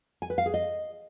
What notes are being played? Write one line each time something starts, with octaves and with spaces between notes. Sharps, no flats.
G#5
B4
F5
G#4
D#5